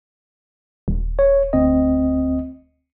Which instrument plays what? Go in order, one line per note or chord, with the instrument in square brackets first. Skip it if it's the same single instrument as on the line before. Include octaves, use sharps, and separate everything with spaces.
[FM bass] D#1
[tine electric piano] C#5
D2 C4 D#5